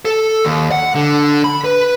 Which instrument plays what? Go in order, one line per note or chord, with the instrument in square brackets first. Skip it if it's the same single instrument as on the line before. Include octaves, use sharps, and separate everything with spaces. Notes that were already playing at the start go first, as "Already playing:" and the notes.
[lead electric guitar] A4
D#2
F#5
D3
B5
B4